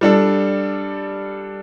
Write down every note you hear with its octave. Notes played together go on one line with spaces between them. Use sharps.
G3 D4 A4